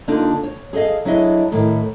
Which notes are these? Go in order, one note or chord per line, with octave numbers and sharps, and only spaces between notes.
D3 A#3 D4 D#4 F4 A4
C#5
G#4 A4 C#5 D#5 F5
F#3 D4 E4 G#4 D#5
A2 D#3 A4